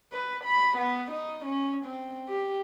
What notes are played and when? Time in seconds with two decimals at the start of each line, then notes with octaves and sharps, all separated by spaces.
0.13 B4
0.45 B5
0.77 B3
1.12 D#4
1.45 C#4
1.85 C4
2.29 G4